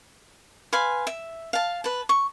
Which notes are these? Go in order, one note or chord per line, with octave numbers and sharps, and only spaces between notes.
B4 F5 G#5 C6
E5
F5 A5
B4 A5
C#6